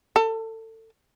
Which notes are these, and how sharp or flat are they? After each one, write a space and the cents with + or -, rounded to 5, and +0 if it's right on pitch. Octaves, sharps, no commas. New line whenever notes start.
A4 +25